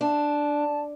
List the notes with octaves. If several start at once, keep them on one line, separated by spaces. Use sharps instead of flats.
D4 A5